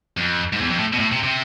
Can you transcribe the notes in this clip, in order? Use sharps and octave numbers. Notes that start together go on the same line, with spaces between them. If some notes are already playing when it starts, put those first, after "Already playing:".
F2
G#2
E2
F2
A2
B2
A2
C3
C3